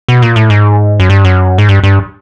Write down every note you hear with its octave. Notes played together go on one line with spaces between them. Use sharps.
B2
A#2
A2
G#2
F#2
G2
F#2
G#2
G2
G2